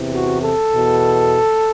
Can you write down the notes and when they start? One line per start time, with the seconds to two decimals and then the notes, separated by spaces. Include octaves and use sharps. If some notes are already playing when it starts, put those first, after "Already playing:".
Already playing: E2 C3 E3
0.14 F#4
0.42 A4
0.71 E2 B2